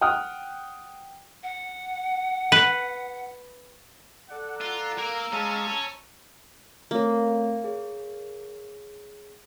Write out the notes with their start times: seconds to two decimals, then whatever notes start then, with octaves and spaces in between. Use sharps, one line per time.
0.01 F#5 G5 D#6 F6 F#6
1.43 F#5
2.52 B4
4.29 A4 D5 F#5
4.61 F4 A#5 E6
4.98 A#3
5.33 G#3 C#5 F5 G#5 A5
6.91 A3 A#3 C4 C#5
7.64 G#4 C#5